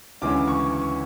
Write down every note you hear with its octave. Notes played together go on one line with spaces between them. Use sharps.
D2 C#3 E3 G#3 C#4 D6
C#6
C#6